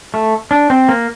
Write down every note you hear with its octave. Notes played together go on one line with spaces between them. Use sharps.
A3
D4
C4
A#3